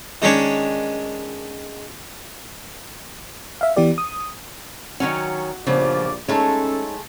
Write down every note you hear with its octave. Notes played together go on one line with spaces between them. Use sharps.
D#3 G#3 C#4 D4 C#5
E5 F5
E3 B3 G4 D5
D#6
D#3 F#3 C#4 F#4
A#1 G2 C#3 F3 B3 D5
G#3 A3 C#4 D#4 A4 C#5